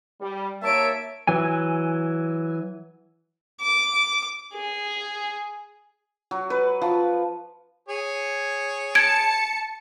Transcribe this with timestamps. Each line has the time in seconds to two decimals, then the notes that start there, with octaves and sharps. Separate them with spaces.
0.20 G3
0.63 D#2 A#3 C#5 E5 A5 D7
1.27 E3 F#3 G#5
3.61 D6
4.53 G#4
6.31 F#3
6.50 B4
6.82 F3
7.88 G#4 C#5
8.95 A5 G#6 C#7 D7